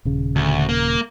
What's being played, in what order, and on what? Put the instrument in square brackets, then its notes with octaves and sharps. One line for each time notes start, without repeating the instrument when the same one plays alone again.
[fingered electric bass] D#1 C#3
[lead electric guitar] D2
A#3